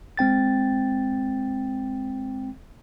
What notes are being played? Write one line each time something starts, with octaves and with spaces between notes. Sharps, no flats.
G#3 C4 G5 A6